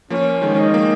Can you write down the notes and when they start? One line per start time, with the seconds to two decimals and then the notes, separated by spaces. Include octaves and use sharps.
0.10 F3 A#3 C#4
0.42 D#3 G#3
0.54 C#4
0.58 D#4
0.73 F3 A#3